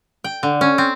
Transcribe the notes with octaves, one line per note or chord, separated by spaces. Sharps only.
G5
D3
C#4
C4